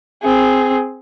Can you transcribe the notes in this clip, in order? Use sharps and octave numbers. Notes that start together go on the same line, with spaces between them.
C4 G#4